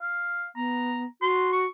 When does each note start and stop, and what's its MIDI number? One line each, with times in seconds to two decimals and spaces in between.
0.02 0.47 77
0.56 1.05 59
0.56 1.04 82
1.22 1.66 66
1.22 1.50 84
1.53 1.66 85